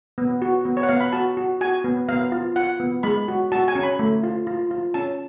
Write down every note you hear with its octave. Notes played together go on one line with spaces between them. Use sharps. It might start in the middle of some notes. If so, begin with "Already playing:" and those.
B3
F#4
B3
C#5
F#5
B3 F5
B5
F#4 A5
F#4
F#4 G#5
B3
B3 F5
F4
F4 F#5
B3
G#3 B5
F#4
F#4 A5
G#5
C#4
B5
A3
F4
F4
F4
C#4 A5